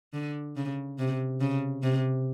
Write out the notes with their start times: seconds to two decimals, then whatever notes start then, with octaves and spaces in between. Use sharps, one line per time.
0.13 D3
0.56 C#3
0.99 C3
1.41 C#3
1.83 C3